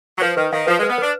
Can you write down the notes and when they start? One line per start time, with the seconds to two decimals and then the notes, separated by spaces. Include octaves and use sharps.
0.17 F#3
0.21 F3 B4
0.37 D#3 B4
0.53 D#3 F5
0.67 F3 B4
0.79 G#3
0.83 B4
0.90 B3
0.98 D4 B4